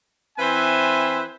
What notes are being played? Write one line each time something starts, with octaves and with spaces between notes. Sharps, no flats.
E3 C4 B4 C5 E5 G#5